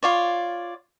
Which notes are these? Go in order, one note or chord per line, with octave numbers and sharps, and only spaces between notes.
F4 C#5 D5